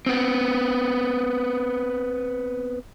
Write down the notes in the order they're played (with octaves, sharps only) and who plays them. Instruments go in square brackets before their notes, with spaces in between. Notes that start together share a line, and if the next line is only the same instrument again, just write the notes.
[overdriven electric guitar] B3 C4